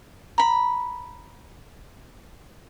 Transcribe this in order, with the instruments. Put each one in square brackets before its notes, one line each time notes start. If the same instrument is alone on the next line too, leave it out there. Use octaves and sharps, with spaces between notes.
[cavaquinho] A#5 B5